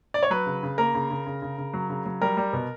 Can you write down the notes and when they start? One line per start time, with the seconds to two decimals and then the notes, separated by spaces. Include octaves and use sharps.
0.14 D5
0.23 C#5
0.30 F#3 B4
0.46 C#3
0.63 C#3
0.78 A#3 A#4
0.94 C#3
1.11 C#3
1.26 C#3
1.42 C#3
1.58 C#3
1.73 F#3
1.89 C#3
2.06 F#3
2.21 G3 A#4
2.37 G3
2.53 B2